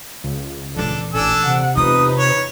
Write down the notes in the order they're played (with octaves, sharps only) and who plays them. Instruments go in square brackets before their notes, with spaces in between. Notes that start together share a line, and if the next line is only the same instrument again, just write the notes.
[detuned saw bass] C#2
[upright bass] D#1 E3 [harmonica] D4 A4
[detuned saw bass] A1 [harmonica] D4 A4 E6 [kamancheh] G#5
[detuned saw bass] C3 [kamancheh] F#5
[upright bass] E2 F4 [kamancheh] D#4 B4 [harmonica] D#6
[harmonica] C#5